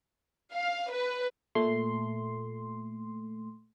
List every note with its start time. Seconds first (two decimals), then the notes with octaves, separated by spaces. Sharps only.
0.54 F5
0.90 B4
1.55 A#2 A3 C6